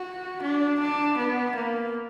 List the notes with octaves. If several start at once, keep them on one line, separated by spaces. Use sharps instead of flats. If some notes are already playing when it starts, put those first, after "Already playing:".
Already playing: F#4
D4
D4
B3
A#3